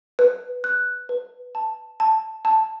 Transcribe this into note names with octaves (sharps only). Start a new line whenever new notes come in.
B4
F#6
B4
A5
A5
A5